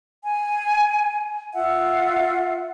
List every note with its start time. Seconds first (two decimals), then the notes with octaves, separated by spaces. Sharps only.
0.23 G#5
1.53 F4 E5 F#5